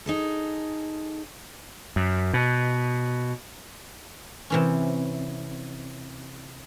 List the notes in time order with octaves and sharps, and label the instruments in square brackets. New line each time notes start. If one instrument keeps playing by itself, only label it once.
[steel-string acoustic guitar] D#4 G#4 A4
[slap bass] F#2
B2
[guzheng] C3 E3 C#4